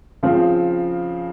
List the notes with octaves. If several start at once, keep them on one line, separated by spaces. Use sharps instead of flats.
C#3 F3 C4